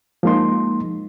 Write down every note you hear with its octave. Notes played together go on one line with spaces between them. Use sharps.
F3 G#3 A#3 D#4 C6